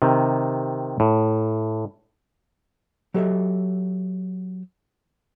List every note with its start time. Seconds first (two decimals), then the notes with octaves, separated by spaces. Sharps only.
0.02 C3 D#3
1.00 A2
3.14 F#3 G4 A4 C#5 D#5 E5